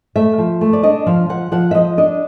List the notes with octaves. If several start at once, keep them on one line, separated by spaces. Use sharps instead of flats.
A3 E5
F3
A3
D5
D4 D#5
F3 F5
F3 F#5
F3 F#5
E5
F3 D#5
D4 D#5